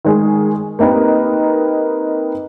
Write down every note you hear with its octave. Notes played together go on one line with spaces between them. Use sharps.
D#3 G#3 G#4
A#3 C4 D#4 G4 A#4 B4